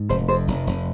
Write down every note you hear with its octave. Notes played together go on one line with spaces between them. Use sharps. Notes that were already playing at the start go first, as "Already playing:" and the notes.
Already playing: G#2
F1 C5
F2 C5
F1
F1